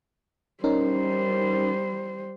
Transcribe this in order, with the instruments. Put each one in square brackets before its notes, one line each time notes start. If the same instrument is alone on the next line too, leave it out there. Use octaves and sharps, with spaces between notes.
[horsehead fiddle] G3 C5 [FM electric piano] C#4 D#4 A#4